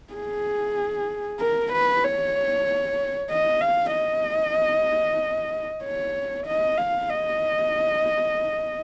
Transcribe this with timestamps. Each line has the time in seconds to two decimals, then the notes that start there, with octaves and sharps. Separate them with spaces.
0.13 G#4
1.40 A#4
1.73 B4
2.04 C#5
3.30 D#5
3.61 F5
3.93 D#5
5.83 C#5
6.46 D#5
6.77 F5
7.09 D#5